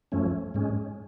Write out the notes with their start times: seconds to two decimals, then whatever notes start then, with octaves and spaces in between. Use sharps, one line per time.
0.12 F#2 F3 A3 C#4
0.54 G#2 G#3 C#4